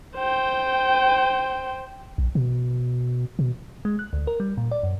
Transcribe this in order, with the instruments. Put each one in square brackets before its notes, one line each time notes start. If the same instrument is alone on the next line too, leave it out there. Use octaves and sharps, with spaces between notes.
[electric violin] C5 G5
[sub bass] A#1
B2
B2
[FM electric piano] G#3
F#6
D2
A#4
G3
A#2
D5
F#2